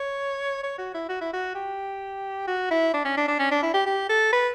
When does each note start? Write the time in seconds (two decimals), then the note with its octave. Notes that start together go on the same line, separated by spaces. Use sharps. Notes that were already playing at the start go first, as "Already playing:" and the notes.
Already playing: C#5
0.63 C#5
0.78 F#4
0.94 E4
1.09 F#4
1.21 E4
1.34 F#4
1.55 G4
2.47 F#4
2.71 E4
2.94 D4
3.05 C#4
3.17 D4
3.28 D4
3.39 C#4
3.51 D4
3.63 E4
3.74 G4
3.86 G4
4.09 A4
4.33 B4